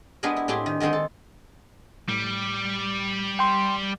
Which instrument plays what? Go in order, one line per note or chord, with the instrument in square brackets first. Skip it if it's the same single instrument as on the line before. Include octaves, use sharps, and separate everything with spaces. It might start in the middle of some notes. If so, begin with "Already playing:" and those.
[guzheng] G#3 B3 D4 G4 G#4 A#4
E4
A2 C4 D4 G4 G#4
D#3
D3 D#3 G#3 C4 D#4
A4
[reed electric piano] A2 [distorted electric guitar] G3
[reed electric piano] G5 C6